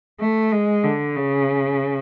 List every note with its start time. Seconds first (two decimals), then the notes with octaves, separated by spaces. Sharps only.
0.20 A3
0.52 G#3
0.84 D3
1.15 C#3